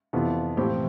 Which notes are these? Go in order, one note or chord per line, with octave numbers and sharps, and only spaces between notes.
F2 C3 E3 B3 F4
A2 C3 E3 F3 C4 G4